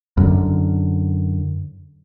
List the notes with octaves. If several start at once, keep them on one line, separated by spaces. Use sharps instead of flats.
F#2 D3